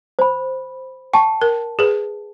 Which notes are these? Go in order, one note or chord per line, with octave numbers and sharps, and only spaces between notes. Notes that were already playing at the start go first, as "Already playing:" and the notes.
C5 B5
G5 A5 C#6
A#4
G#4 B4